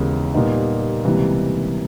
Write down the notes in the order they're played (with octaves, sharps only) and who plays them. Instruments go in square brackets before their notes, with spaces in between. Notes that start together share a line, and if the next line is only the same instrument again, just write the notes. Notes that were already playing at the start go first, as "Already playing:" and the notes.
Already playing: [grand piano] D#2 C#3 E3 G#3 B3
A#2 G3 B3 D#4
C#2 C3 E3 G3 A#3